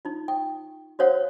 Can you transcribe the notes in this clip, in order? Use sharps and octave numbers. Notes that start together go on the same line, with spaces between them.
D#4 F4
G5
F#4 A#4 C5 C#5 F5 F#5